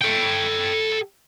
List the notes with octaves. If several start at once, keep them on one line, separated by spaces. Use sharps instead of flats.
A4 G5